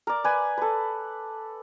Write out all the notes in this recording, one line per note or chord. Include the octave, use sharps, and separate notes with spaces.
A#4 D5
B4 D5 G#5
A4 B4